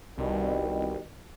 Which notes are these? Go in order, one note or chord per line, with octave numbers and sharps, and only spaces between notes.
C2 B2 D#3 G3